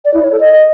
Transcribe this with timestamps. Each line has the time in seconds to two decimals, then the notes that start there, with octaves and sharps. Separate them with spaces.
0.04 D5
0.13 E4
0.22 C#5
0.31 A4
0.40 D#5